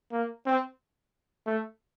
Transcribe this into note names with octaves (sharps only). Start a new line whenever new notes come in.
A#3
C4
A3